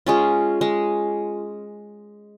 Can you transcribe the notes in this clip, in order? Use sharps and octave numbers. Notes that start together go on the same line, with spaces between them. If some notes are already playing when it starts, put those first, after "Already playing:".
G#3 C#4 F4
G#3